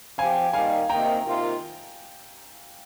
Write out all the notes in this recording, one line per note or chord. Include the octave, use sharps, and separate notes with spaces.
F3 C4 G4 F5 G#5
D#2 D#3 G3 F5 G#5
C3 D#3 A#3 G5 A#5
C3 D#3 A#3 F4